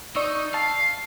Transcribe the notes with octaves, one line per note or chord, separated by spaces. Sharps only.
D#4 D5 C#6 E6
F5 A5